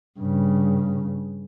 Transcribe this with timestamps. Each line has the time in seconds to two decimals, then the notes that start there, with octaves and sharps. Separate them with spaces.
0.19 G2 C#3